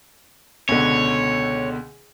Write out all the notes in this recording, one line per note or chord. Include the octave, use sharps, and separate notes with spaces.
C#2 B2 D3 C#5